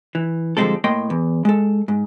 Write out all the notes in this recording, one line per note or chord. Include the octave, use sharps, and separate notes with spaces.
E3
D3 F3 G3 G#3 C4 A4
A2 A#3 D#5 G5 C6
E2
G#3 A4
G#2